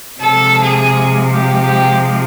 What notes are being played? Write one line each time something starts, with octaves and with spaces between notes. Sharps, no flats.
C3 F3 G#3 A4
G#4
G4
G4